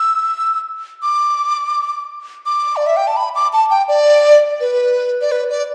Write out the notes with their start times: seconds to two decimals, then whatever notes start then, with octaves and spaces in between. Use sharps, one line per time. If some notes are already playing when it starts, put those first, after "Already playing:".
Already playing: E6
1.02 D6
2.46 D6
2.76 D5
2.87 E5
2.97 G5
3.07 A5
3.17 B5
3.35 D6
3.53 A5
3.70 G5
3.88 D5
4.60 B4
5.21 D5
5.32 B4
5.50 D5